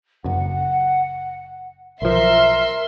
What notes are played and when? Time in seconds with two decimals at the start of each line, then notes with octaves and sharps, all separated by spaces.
0.24 F#1 F#2 F#5
2.02 B1 F3 A#4 E5 C6